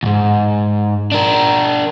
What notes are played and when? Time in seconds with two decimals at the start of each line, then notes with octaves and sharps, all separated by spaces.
0.03 D2 G#2
1.12 D4 A#4